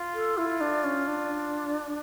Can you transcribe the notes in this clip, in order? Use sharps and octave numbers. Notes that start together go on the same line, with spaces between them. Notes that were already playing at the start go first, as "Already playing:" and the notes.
Already playing: F4
A4
E4 F4
D4
C#4
D4